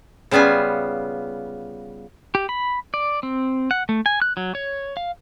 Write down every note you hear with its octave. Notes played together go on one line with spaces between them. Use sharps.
C#3 G3 B3 F4 G#5
G4
B5
D5
C4
F#5
A3
G#5
F#6
F#3
C#5
F5